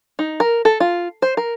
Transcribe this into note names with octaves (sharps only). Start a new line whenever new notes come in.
D#4
A#4
A4
F4
C5
A#4